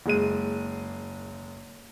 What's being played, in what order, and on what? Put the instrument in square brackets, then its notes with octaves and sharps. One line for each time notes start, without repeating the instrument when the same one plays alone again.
[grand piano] F#1 G#3 D#7